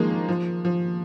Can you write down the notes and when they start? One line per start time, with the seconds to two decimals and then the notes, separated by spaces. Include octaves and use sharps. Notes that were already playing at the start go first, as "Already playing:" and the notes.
Already playing: D#3 F3 G#3 A#3
0.29 F3
0.65 F3